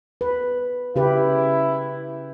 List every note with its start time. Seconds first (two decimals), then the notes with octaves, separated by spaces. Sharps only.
0.21 B4
0.96 C#3 E4 G4 B4